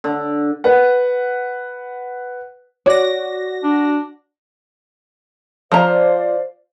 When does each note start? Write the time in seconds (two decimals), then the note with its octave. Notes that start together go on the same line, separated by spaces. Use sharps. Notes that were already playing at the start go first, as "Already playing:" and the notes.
0.04 D3
0.64 B4 F#5
2.86 F#4 C#5 D5 A#6
3.63 D4
5.72 F3 C5 D5 F5 A#5